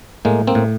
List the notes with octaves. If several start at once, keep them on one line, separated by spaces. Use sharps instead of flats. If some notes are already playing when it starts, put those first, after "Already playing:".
A2 G#3 A#3
A#3 C4
A2